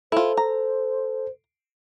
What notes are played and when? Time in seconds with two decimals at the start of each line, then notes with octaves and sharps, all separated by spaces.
0.12 E4 F4 A4 C5
0.37 A#5